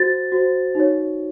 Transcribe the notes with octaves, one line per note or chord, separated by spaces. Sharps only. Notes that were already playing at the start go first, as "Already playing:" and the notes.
Already playing: F#4 C5 A6
F#4 C5
D#4 F#4 C#5